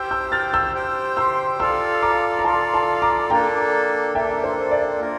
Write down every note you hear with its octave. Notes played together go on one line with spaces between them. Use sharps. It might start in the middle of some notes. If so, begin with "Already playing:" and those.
Already playing: G4 C5 G5 E6 G6
E6 G6
F6 A6
E6 G6
G4 C5 G5
C6 E6
F4 A4 D5 F5 C6 E6
A#5 D6
A#5
F4 A4 D5 F5 A5 C6
A5 C6
A#5 D6
A#3 D4 A4 G5 A#5
A#3 D4 A4 E5 G5
C5
D5
A#3 F4 A#4